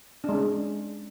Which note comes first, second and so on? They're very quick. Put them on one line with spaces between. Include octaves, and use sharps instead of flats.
D4 G#3 C#4